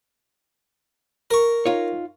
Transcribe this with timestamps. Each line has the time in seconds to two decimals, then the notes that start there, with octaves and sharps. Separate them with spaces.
1.31 A#4 C#6
1.66 D#4 F4 C#5